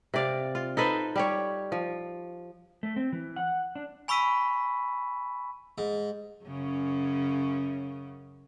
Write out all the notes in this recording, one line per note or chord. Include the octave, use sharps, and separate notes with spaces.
C3 D5 F5
F4
D#4 A4 B4 C5
G3 G4 C#5
F3
A3
C4
E3
F#5
D4
G#5 B5 C#6 E6 B6 D#7
G#2
F#2 C#3 C#4